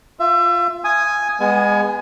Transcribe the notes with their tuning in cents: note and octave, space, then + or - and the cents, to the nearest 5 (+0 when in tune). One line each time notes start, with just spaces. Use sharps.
F4 +0 E5 +30
G#5 +0 D#6 +0
G#3 -25 B3 +0 G#5 +20